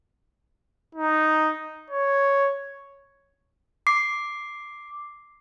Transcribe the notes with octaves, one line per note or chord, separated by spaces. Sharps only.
D#4
C#5
D6 C7